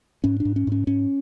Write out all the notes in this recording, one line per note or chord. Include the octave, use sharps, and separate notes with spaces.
G#2 C#4
D4
G#2
C#4
G#2 C#4
G#2 C#4